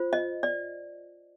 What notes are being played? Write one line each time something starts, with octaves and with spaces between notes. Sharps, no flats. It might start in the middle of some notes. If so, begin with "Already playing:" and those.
Already playing: F4 C5
D#5
D5